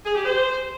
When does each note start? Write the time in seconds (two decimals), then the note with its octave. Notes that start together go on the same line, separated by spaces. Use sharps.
0.05 G#4
0.15 G4
0.25 C5